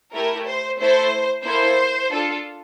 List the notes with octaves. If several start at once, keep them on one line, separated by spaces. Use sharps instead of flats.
A3 E4 G4 A#4
C5
A3 E4 A4 C5
A#3 E4 A4 C5
D4 F4 A4